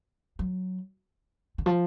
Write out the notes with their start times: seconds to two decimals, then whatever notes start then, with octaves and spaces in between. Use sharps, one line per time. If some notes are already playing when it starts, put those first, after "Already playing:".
0.39 F#3
1.58 D3
1.66 F3